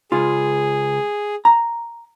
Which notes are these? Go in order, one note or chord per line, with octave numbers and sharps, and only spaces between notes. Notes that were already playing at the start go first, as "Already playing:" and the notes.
C#2 F4 G#4
A#5